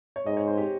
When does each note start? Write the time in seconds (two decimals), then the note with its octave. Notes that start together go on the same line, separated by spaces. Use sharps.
0.16 C#5
0.26 G#2 D#5
0.37 C#5
0.47 C5
0.57 G4